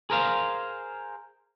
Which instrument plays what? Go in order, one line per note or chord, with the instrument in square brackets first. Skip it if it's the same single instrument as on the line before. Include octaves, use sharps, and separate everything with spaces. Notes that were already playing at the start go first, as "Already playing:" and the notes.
[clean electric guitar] G#4 A#4 C5 F5